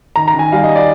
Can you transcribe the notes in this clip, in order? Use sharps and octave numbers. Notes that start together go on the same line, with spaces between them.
D#3 A#5
A#5
D#3
G#5
G3 F5
D#5
D5